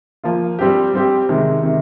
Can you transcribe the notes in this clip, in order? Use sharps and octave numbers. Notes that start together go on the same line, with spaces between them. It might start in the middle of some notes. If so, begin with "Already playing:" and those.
F3 A#3 F4
G3 C4 G4
G3 C4 G4
C3 D#3 G#3
C3 D#3